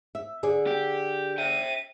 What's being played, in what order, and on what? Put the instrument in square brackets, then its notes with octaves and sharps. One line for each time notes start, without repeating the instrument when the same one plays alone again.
[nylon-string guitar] E5
D3 G#4 D5
[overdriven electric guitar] G4
[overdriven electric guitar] E5 G5 [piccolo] D#7